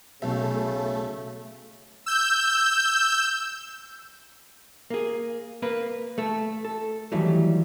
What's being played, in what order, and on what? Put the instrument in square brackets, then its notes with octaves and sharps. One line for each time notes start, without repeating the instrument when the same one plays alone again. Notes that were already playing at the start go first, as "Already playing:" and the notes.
[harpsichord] B1 [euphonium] C#3 [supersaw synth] A3
[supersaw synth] E6 G6
[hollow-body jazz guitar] A#3 G#4
A#3 A#4 B4
A3 A4
A4
D#2 E3 F#3 G3 A3